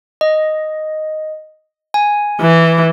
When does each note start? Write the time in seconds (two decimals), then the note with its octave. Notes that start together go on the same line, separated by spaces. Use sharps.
0.21 D#5
1.94 G#5
2.41 E3